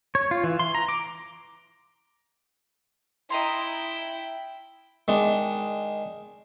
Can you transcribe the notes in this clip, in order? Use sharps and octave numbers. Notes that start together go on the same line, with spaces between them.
C#5
F4
E3
C6
A#5
D6
E4 D#5 G5 A#5 C6
D#3 G#3 D4